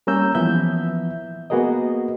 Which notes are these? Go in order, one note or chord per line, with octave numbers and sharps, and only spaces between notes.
G3 A#3 C#4 A#5 E6 G6
E3 F3 B3 E5 G6
A#3 B3 F#4 G#4 A#4 D#5